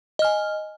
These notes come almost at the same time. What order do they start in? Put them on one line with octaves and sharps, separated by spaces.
D#5 F6 G#5